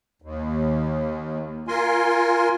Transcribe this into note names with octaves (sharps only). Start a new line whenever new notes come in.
D#2
F4 A#4 G#5 C6